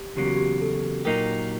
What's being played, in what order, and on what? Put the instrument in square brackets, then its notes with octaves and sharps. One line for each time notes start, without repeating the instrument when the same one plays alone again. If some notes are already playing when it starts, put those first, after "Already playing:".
Already playing: [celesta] G4
[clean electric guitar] E2 C#3 F#3 A#3 [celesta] G4
[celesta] F#4
G4
A4
[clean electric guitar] A#2 F#3 A#3 D#4 G4 [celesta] A#4